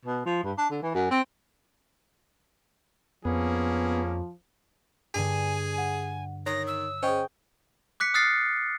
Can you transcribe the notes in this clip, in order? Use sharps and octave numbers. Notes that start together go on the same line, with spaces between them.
B2
F3
G2
D4
D3
E3
F#2
C4
F2 F3 A#3 B3 C#4 G#4
G2 D3 G#4 G#5
F#5
D#3 C#5 D#6 A#6 C7
E6
C#4 G#4 C5 D#5 G5 C#6
D6 F#6 B6 C#7
D#6 F6 F#6 A6 C7